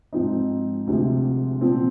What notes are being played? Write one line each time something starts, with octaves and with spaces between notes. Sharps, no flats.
G#2 F3 C4 D#4
D2 C3 F3 G#3
A#2 F3 C4